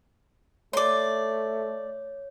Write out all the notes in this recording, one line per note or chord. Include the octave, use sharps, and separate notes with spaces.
A3 C#5 D5 C6